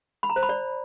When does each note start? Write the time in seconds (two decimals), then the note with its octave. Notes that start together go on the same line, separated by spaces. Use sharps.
0.23 B5
0.30 A#5
0.36 C5
0.43 B5
0.49 D5